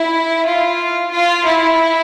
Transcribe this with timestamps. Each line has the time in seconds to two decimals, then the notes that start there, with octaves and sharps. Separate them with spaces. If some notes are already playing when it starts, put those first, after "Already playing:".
Already playing: E4
0.46 F4
1.12 F4
1.46 E4